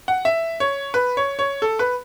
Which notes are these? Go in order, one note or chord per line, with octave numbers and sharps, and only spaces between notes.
F#5
E5
C#5
B4
C#5
C#5
A4
B4